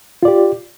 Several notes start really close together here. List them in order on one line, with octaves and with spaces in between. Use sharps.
F4 D5 G4